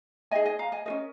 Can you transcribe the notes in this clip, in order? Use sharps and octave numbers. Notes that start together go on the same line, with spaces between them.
D#4 G#4 D#5 G#5
D#5 G#5
F5 A#5
D#5 G#5
C#4 F4 A#4 D#5